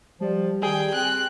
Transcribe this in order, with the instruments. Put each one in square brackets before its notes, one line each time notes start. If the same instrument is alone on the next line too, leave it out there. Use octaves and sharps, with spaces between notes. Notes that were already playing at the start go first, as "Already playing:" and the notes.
[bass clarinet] F3 [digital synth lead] G3
[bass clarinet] D#3 [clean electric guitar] G#4 [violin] G5
[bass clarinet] C4 [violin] F#6